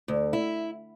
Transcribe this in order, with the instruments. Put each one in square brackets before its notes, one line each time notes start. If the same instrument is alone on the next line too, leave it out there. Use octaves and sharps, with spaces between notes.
[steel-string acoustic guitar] D2
E4